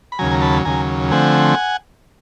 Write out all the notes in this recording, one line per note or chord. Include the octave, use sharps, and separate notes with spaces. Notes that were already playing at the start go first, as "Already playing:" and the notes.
B5
D#2 C#3 F#3 G#5 A#5
A#5
A5 B5
D#2 C#3 F#3 G#5 A#5
D3 F3 A3 C4 F#5 G#5